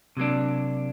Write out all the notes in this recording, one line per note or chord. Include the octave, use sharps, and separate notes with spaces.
C3 F#3 A#3 D4